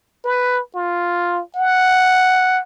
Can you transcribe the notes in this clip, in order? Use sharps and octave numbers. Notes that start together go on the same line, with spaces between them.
B4
F4
F#5